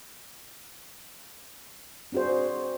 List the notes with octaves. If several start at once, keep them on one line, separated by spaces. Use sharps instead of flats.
C4 D4 F#4 G#4 C5